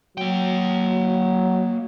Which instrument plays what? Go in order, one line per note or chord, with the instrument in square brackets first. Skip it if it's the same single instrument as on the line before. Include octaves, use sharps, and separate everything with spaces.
[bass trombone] F#3 [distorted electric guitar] A#3 G5